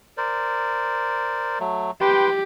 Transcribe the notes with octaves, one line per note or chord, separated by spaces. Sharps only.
A#4 C5 D5
F#3 A3
G4 B4 G5 C6